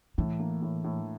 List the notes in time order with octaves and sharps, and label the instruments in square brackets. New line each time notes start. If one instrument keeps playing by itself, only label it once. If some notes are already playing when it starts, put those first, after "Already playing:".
[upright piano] A2 [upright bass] E3
[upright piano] A#3
A2
A2